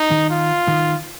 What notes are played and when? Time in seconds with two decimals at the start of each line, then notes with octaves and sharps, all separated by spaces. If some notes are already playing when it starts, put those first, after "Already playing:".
Already playing: D#4
0.11 D#3
0.30 F4
0.68 D#3